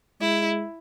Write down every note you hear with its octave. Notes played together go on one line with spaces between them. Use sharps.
G#3 E4